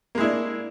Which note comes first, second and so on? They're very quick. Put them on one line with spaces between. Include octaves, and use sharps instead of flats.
A#3 G#3 E4 D4